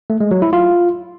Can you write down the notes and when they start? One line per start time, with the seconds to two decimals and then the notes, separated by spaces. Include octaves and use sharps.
0.10 A3
0.20 G#3
0.31 F#3
0.42 E4
0.53 F4